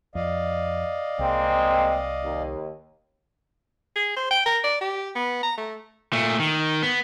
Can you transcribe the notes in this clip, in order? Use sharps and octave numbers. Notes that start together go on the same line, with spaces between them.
F2 D5 D#5 F5
C2 G#3 A#3 C4
D#2
G#4
C5
G5
A#4
D5
G4
B3
A#5
A3
A#2 A3
D#3
B3